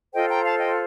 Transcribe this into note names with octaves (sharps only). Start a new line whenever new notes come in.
F4 A4 C5 D#5 G5
G5 A#5
F5 A5
D#5 G5